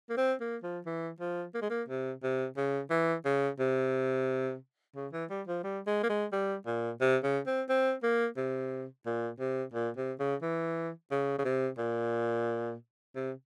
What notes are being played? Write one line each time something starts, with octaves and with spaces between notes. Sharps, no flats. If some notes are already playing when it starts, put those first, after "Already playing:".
A#3
C4
A#3
F3
E3
F3
A#3
G#3
A#3
C3
C3
C#3
E3
C#3
C3
C#3
E3
G3
F3
G3
G#3
A#3
G#3
G3
A#2
C3
C#3
C4
C4
A#3
C3
A#2
C3
A#2
C3
C#3
E3
C#3
C#3
C3
A#2
C3